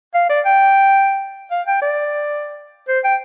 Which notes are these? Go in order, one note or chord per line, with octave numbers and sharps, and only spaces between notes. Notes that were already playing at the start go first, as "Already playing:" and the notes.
F5
D5
G5
F5
G5
D5
C5
G5